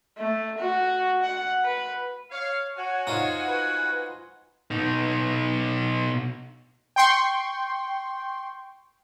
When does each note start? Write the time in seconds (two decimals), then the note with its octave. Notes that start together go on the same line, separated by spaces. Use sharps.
0.18 A3
0.59 F#4
1.23 F#5
1.65 B4
2.31 C#5 F5
2.77 F#4 C#5 G#5
3.07 D#4 F4 C5
3.47 B4 F#5
4.71 B2 D#4
6.96 G5 C6 C#6